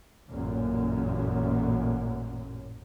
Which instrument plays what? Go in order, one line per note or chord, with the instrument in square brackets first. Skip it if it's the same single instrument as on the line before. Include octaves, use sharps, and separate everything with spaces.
[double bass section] A1 F#2 A#2